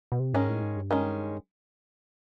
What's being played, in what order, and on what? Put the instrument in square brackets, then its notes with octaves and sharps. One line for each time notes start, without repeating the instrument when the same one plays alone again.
[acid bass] B2
C3
[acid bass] G#2 [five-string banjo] D#3 G#3 C#4
[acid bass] A2
G#2
G2
[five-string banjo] D#3 G#3 C#4